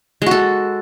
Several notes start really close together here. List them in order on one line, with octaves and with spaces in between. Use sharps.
G#3 F#4 A4